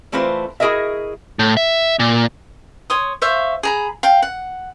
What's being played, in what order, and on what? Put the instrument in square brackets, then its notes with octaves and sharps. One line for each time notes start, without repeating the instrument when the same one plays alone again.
[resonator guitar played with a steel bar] E3 A3 C4 F4 B4 C5
E4 F#4 G#4 A#4 D#5 E5
[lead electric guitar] A2
E5
A#2
[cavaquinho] C#5 C6 D#6
C5 E5 F5 C#6
G#4 A#5 B5
F5 G5
F#5